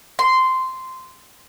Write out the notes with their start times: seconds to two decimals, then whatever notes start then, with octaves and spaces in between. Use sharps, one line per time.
0.19 C6